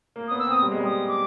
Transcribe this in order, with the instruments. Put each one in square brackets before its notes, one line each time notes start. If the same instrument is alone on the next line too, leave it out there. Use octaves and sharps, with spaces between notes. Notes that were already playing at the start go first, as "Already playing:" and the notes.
[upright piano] A#3
[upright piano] B3 [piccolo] D#6
[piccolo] E6
[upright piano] C4 [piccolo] D#6
[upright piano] G3
G#3
[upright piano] G3 [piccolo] D#6
[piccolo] D6